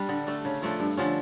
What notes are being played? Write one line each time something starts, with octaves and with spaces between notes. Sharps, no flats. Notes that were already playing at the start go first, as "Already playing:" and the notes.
Already playing: G3 D4
D3
A3 D4
C#3
F3 A3 D4
G2
D3 F3 C#4